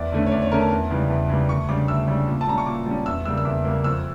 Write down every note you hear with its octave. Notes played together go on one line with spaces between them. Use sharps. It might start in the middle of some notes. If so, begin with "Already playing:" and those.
Already playing: E2 D5
D3 A3 C#4
C#5
E2 D5
C#5
D3 A3 C#4 A#4
A5
E2
C#3 E3 G3
E2
C#3 E3 G3
D2 C#6
C#3 G3 D4 D6
D2 E6
C#3 G3 D4
A#2
A5
G3 C#4 A#5
C#6
A#2 D6
G3 C#4
E2 E6
C#3 G3 A#3 E6
E6
E2 D6
C#3 G3 A#3
F2 E6